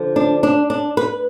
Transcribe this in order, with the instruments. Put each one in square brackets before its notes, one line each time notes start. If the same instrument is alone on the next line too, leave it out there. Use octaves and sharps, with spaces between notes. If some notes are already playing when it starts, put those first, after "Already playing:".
Already playing: [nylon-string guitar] D3 F3
D4
D4
D4
B4